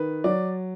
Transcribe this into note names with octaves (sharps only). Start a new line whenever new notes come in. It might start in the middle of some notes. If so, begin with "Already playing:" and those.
Already playing: D#3 B4
F#3 D5